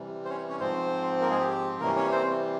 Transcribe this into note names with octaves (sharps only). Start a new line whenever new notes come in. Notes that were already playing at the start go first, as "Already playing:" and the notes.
Already playing: C3 E3 G3
C5
C#4 C#5
C#4 C#5
G#2 F3 C4 C5
A#3 A#4
G#3 G#4
G4
C3 E3 G3 A#3 C#4 A#4
C#4 C#5
C4 C5